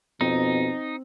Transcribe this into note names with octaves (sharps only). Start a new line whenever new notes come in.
F2 B2 C4 D#4